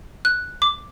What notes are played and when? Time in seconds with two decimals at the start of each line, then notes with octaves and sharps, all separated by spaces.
0.25 F#6
0.62 D6